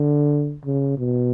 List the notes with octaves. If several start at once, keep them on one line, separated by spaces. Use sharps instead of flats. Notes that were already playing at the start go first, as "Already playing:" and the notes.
Already playing: D3
C#3
B2